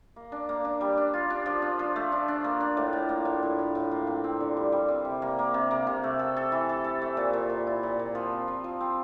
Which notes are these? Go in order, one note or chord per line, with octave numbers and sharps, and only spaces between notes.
A#3
D4
A#3
D4
G3
D4
F4
D4
F3
D4
F3
A3
D4
D4
A#3
D4
A2
A2
A#3
A2
A2
A2
A2
A#3
C4
C4
D3
G3
G3
C4
C3
A#3
A#3
C3
A#3
C3
A3
A4
A4
E3
A4
A4
A3
A#2
A#2
A#2
E4
A#2
A#2
F3
C4
F3
F3
C4